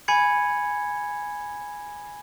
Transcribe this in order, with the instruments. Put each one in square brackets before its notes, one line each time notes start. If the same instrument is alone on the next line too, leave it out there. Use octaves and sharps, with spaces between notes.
[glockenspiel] G#5 B5 G#6 C#7